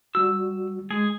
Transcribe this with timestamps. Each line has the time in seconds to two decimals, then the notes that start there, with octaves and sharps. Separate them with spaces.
0.15 G3 F#4 E6
0.91 G#3 G#4